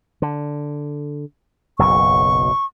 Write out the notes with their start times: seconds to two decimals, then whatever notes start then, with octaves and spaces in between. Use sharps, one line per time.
0.22 D3
1.79 F#1 B1 F#2 C#6